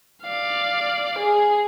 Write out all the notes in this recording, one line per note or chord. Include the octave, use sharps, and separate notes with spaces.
D5 F5
G#4